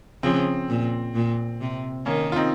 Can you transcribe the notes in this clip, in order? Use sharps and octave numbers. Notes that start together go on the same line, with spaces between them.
C#3 F3 C4
A#2
A#2
C3
D#3 A#3 C#4
F4
C4 D#4